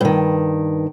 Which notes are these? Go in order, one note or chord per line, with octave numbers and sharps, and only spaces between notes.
G2 D#3